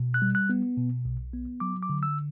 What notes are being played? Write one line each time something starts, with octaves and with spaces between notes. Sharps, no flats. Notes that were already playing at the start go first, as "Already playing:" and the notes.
Already playing: B2
F#6
G3
F#6
B3
B2
B1
B3
F#3 D6
D6
D3
E6